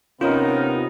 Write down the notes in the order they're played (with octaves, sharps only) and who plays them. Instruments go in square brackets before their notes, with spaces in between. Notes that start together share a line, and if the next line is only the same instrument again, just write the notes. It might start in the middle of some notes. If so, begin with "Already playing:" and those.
[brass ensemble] C3 B3 D#4 [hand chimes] C#4 C#5 [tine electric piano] F4 [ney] A#4